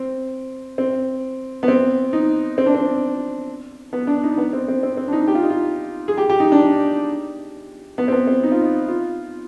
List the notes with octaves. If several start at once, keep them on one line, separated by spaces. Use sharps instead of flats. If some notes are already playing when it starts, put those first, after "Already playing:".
Already playing: C4
C4
B3
C4
D#4
C4
D4
C4
B3
D4
D#4
B3
C4
C4
C4
C4
D4
D#4
G4
F4
D#4
F4
G#4
G4
G4
D#4
D4
B3
C4
B3
C4
D#4
F4
D#4
F4